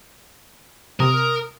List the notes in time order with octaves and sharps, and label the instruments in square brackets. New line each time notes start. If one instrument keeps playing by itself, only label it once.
[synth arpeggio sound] C3 [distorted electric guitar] A#4 [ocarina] D#6